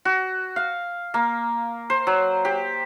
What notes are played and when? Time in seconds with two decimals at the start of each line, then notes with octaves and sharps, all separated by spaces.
0.05 F#4
0.56 F5
1.14 A#3
1.90 C5
2.07 F#3
2.45 G4